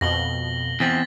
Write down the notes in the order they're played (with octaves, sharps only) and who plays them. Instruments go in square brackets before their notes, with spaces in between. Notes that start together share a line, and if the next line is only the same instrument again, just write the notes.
[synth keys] F2 B2 [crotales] A#6 F#7 G7
[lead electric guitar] E2 C4 [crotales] A6 B6